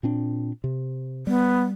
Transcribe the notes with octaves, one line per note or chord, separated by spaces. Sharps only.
A#2 C4 D4
C3
G3 B3